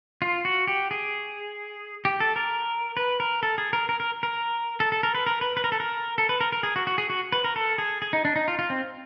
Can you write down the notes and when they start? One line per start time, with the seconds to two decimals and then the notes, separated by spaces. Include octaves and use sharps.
0.22 F4
0.45 F#4
0.67 G4
0.91 G#4
2.05 G4
2.20 A4
2.36 A#4
2.97 B4
3.20 A#4
3.43 A4
3.58 G#4
3.73 A#4
3.89 A#4
4.00 A#4
4.23 A#4
4.80 A4
4.92 A4
5.03 A#4
5.15 B4
5.27 A#4
5.41 B4
5.57 B4
5.64 A#4
5.72 A4
5.80 A#4
6.18 A4
6.29 B4
6.41 A#4
6.52 A#4
6.63 G#4
6.76 F#4
6.87 F#4
6.98 G#4
7.10 F#4
7.32 B4
7.44 A#4
7.56 A4
7.78 G#4
8.02 G#4
8.13 D#4
8.25 D4
8.36 D#4
8.48 F4
8.59 F4
8.70 C4